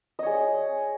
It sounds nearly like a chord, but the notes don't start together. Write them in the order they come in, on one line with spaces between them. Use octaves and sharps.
D#5 C#5 G#4